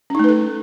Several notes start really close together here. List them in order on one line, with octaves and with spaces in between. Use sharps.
C#4 D#4 A3 B4 A4